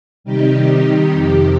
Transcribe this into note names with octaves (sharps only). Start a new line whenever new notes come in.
C3 D#3 G3 D#4 G4
F2 C3 D#3